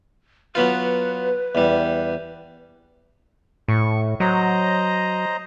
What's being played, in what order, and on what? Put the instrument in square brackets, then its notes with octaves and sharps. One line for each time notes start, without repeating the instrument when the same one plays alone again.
[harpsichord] F#3 B3 F4 [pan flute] B4
[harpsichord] E2 G3
[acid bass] A2 [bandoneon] C#6
[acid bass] F#3 [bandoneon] C5 D#5 A#5